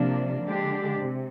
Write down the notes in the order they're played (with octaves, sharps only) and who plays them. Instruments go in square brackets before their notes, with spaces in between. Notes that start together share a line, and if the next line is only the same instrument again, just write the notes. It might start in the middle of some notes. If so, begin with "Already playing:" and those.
Already playing: [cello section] C3 F3 A#3 D4
D3 G#3 D4 G4
C3